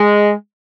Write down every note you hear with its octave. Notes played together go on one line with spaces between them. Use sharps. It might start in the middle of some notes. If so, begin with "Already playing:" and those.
Already playing: G#3